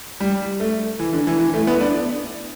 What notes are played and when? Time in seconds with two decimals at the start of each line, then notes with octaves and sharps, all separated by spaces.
0.20 G3
0.60 A3
0.99 E3
1.13 D3
1.27 E3
1.40 E3
1.54 A3
1.67 B3
1.81 D4